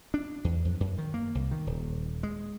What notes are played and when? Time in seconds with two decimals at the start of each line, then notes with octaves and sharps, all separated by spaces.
0.14 D4
0.44 E2
0.65 F2
0.80 F#2
0.98 D#3
1.14 A#3
1.35 C2
1.51 D#3
1.67 D#1
2.23 G#3